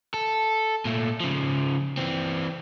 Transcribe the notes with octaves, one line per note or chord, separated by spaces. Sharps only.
A4
A#2 A3
C#3 F3
E3 C4